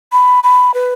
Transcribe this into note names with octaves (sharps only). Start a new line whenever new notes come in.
B5
B5
B4